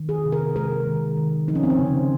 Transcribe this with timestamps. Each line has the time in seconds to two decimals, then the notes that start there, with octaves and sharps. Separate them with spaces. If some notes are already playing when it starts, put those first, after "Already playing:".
Already playing: D#3
0.09 G#4
0.25 C3
0.32 A#4
0.56 G#3 A#4
0.87 D#3
1.17 D#3
1.48 F3 D#4
1.55 C#4
1.63 C4
1.70 C#4
1.79 C#3